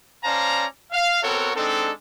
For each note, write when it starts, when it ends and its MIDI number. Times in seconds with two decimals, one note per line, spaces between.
0.24 0.66 61
0.24 0.66 72
0.24 0.66 74
0.24 0.66 77
0.24 0.66 81
0.24 0.66 82
0.92 1.22 77
1.23 1.50 59
1.23 1.50 60
1.23 1.50 66
1.23 1.50 69
1.23 1.50 70
1.23 1.50 73
1.55 1.91 56
1.55 1.91 60
1.55 1.91 62
1.55 1.91 63
1.55 1.91 69